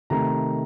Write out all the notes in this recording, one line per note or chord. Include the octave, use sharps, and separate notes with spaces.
C3 D#3 A3 A#5